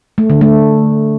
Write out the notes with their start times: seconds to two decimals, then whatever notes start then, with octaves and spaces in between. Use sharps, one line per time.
0.18 A3
0.30 D3
0.41 A3